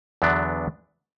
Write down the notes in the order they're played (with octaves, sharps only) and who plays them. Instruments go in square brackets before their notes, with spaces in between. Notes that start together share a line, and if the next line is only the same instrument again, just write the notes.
[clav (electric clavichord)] E2 D3 F#3 B3 D4